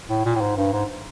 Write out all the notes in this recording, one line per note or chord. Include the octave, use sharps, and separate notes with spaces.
A2
A#2
A2
G#2
G2
G#2